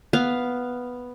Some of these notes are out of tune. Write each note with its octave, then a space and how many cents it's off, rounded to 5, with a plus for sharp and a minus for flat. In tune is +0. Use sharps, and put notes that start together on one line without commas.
B3 +0 F5 +0